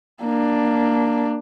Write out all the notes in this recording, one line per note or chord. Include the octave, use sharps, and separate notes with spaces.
A#3 D4